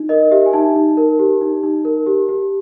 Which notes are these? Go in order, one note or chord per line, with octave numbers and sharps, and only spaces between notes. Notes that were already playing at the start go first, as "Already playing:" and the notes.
Already playing: D#4
A#4 D#5
G4 E5
G#5
D#4 A5
D#4
A#4
G4
D#4
D#4
A#4
G4
G4